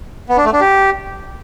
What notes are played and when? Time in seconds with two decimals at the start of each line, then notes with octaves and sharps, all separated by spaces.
0.29 B3
0.37 D4
0.45 A3
0.53 D4
0.61 G4